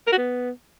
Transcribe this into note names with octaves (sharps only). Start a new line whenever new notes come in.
A#4
F#4
B3